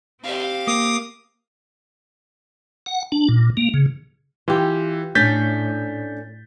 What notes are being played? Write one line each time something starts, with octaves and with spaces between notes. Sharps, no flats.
C4 G4 F5
A#3 D6 D#6
F#5
D4
A#2
A#3
C#3
E3 F4 G4
A2 A3 C#4 D4 G6 A6 B6